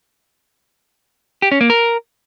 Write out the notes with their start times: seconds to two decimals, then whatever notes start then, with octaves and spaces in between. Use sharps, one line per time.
1.42 G4
1.52 C#4
1.61 A#3
1.70 A#4